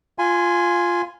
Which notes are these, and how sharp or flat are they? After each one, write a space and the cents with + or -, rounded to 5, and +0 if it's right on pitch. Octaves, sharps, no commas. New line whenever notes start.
F4 +0 G#5 +0 C6 -40